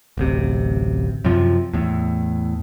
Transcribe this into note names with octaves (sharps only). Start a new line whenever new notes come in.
D1 A1 C3
F#2 C3 F3
E2 A2